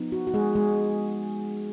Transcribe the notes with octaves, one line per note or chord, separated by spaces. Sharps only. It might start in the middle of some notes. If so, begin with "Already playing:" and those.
Already playing: F3 B3 D#4
F#4
F#4
G#3 G#4
G#3 G#4